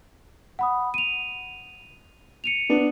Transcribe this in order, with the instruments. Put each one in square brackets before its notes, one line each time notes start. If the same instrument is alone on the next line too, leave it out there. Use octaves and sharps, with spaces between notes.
[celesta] F#5 B5 D#6
D#7 F7
C#7 D#7 F7
[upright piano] B3 D4